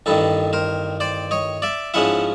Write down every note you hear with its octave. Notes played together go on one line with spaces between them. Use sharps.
A1 G2 D#3 A4 B4
A#4 C5
C5 D5
C#5 D#5
D5 E5
G#2 F3 G#3 C#4 E4 E5 F#5